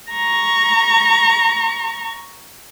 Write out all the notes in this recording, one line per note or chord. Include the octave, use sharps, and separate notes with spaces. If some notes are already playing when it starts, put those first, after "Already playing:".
A#5 C#6